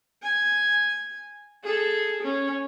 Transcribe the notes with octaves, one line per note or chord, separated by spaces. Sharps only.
G#5
G#4 A4
C#4